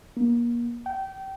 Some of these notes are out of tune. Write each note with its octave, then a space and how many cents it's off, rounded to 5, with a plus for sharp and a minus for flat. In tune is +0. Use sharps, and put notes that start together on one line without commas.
A#3 +30
G5 -30